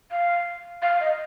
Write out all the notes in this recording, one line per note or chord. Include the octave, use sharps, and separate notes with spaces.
F5
F5
D#5